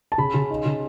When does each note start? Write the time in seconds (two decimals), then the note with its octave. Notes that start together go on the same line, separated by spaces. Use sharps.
0.12 A5
0.18 C#3 B5
0.34 C#3
0.50 D#4
0.65 C#3